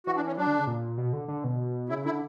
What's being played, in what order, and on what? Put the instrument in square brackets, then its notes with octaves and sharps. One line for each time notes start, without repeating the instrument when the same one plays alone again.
[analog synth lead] E3 [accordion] F#4
[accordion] D4
C#4
[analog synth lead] F#3 [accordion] D4
[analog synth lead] D3
C#3
A#2
B2
D3
D3
B2
[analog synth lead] C#3 [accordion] E4
[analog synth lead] D3 [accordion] E4